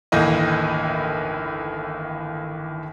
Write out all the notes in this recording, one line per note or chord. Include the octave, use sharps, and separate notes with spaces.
G1 D#2 A2 E3 A#3 D#5